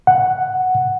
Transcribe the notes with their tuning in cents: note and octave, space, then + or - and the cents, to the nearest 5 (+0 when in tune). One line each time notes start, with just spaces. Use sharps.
F#5 +0